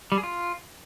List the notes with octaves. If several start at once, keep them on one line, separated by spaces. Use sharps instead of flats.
G3
G#4
F4